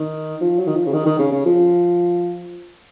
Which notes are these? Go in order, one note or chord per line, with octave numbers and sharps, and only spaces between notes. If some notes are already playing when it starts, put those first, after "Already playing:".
Already playing: D#3
F3
F#3
D#3
F3
C#3
D#3
D#3
C#3
C#3
F3